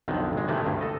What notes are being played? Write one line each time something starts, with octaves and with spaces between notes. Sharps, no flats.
B1 F2 D3 D#3
G#1 G#3
A2 C3 D#3 E3 A3 A#3
D2 G2
A4 D#5